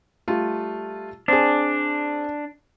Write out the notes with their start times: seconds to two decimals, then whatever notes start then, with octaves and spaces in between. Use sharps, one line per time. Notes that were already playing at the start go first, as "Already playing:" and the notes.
0.28 G3 A3 F4
1.28 C4 D4 G#4